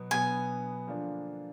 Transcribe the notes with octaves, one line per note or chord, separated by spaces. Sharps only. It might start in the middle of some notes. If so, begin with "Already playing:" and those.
Already playing: B2 F#3 B3
B2 F#3 B3 G#5
D3 F3 A#3 D4